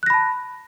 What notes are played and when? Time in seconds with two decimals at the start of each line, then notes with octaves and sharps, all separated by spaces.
0.03 F#6
0.06 A#6
0.10 B5
0.14 A5